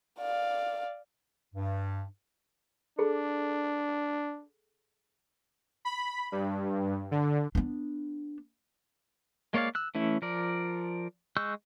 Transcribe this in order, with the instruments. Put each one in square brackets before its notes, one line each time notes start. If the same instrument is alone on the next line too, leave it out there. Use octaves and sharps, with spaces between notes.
[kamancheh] D5 F5
[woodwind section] G2
[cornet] D4 [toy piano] G#4 A4
[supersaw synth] B5
G2
D3
[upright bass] B3 D4
[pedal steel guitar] G#3 A#3 C#5 D5 F5
E6 F#6
E3 A3 C#4 E4
F3 A#4 D5
G#3 C#6 E6 F#6 G6